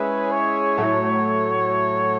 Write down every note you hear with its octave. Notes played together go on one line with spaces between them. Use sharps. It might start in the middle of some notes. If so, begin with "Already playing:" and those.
Already playing: G#3 C#4 E4 G#4 B4
C#5
A2 F#3 A3